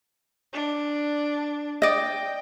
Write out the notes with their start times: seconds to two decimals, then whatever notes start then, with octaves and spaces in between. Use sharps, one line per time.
0.53 D4
1.82 D5 D#5 G5